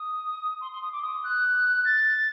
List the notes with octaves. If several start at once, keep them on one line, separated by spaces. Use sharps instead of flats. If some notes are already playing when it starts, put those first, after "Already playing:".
Already playing: D#6
C6
C6
D#6
D6
D#6
F#6
A6